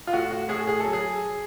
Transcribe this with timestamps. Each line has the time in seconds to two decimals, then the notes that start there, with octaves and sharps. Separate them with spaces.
0.07 F4
0.13 A2 F#4
0.31 F#4
0.49 A2 G#4
0.67 G#4
0.80 F#3 A4
0.93 G#4